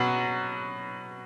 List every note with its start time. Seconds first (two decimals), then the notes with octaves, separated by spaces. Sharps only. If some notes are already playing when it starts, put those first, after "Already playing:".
Already playing: B2 F#3